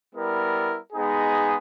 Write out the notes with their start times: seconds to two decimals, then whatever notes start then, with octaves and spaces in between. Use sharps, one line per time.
0.14 G3 B3 E4 A#4
0.93 G#3 B3 D#4 G#4